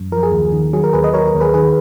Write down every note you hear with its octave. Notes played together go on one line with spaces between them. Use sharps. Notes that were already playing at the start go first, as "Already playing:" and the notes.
Already playing: F#2
F3 A#4
G#4
D#2
D#3
F#3 G#4
A#4
D#2 G#4 B4
B4 D#5
F#3 A#4 C#5
A#4
D#2
G#4 B4
D#3 G#4 B4